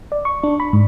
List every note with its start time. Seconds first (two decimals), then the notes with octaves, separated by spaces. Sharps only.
0.12 D5
0.25 C#6
0.44 D4
0.60 B5
0.73 G#2